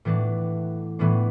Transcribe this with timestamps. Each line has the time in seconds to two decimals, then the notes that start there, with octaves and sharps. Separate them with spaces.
0.05 A2 E3 B3 D4
0.99 A2 E3 B3 D4